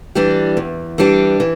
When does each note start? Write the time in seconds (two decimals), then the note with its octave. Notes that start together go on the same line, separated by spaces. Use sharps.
0.15 E3 G3 D4 G4
0.57 E2
0.98 E3 G3 D4 G4
1.40 E3